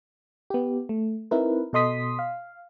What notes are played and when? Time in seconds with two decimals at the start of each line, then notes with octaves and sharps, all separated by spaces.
0.50 B3 G4
0.89 A3
1.31 C4 D#4 E4 A#4 B4
1.73 B2 A4 D#5 C6 D#6 B6
2.19 F5